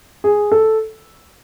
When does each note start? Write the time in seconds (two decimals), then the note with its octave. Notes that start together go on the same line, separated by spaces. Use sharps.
0.24 G#4
0.52 A4